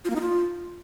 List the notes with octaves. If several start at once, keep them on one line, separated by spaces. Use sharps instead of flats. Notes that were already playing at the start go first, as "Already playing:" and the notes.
F4
A#3
D#4
F4